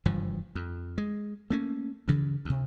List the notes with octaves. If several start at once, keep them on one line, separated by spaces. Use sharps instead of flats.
F#1 G2 E3 F3
F2
G#3
A3 A#3 C#4
D2 G2 C#3 E3
D2 C3